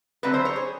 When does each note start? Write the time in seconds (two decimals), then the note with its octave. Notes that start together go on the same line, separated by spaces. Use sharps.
0.23 D3 F#3 A3 C4 B4
0.34 C5
0.45 C#5
0.56 G#4